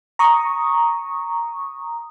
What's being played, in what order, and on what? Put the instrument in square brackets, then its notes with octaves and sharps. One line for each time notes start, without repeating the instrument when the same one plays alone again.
[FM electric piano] A#5 C#6 D#6